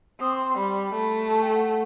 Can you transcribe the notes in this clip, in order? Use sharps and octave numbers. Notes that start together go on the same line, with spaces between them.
C4 D#6
C6
C6
G3 B5
A3
A5
G5
F#5